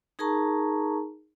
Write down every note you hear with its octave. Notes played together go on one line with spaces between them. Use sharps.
D#4 G#4 A#4 A5 A#5 C#6